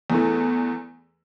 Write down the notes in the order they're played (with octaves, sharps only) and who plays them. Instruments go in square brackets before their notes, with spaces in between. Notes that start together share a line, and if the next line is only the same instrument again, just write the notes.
[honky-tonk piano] E2 E3 A3